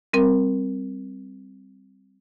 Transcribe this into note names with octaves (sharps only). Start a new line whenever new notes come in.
G3 C4 A#4